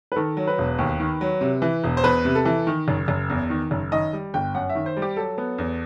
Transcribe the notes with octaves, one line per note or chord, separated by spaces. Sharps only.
B4
D#3 A4
F#3
B4
E1
D#2
D#3
F#3
C3
E3
E1
C5
E2 B4
C3
A4
E3
D#3
F#1
F#1
E2
D#3
F#1
D#3 D#5
G3
G1 G5
F#2 F#5
E5
D#3
C5
G3
G4
F#3 A4
B3
E2